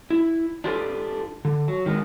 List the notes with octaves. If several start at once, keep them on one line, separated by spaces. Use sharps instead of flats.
E4
D4 D#4 F4 G4 A4 B4
D3
F#3
D#3 G#3 A#3 B3